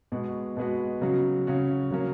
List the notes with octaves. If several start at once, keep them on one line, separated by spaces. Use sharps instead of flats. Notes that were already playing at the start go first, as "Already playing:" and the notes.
B2 G#3 B3 F#4
B2 G#3 B3 F#4
C#3 F#3 C#4 F#4
C#3 F#3 C#4 F#4
C#3 F#3 A#3 C#4